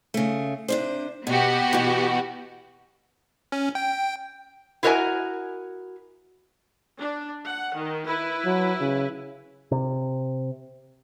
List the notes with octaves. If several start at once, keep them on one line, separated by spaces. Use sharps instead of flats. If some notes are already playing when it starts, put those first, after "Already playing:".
C#3 A3
C3 D4 C5
B2 B3 F#4 G4
B2 E3
C#4
G5
E4 F#4 A#4 C#5 D#5 G#5
D4
F#5
D#3
E4 B4
F#3
C#3
C3